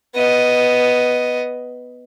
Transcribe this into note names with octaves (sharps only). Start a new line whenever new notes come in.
B3 D#5